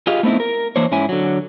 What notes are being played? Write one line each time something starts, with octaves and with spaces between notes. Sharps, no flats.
F4 G4 G#4 D#5 F5
A3 B3 C4 D#4 E4
A#4
E3 A#3 D4 C5 C#5
G#2 C#4 E4 G#5
D3 F#3